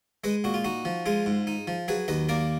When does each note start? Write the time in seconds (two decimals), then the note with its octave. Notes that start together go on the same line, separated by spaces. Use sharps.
0.24 G#3 B4 D#5
0.44 A#2 F#4
0.54 F4
0.64 D#4 F#4
0.85 F3
1.06 G#3 F4 G#4
1.26 G#2
1.47 D#4
1.67 F3
1.88 F#3 G#4 B4
2.08 D#2 B4 D#5
2.29 A#3 A#4 D5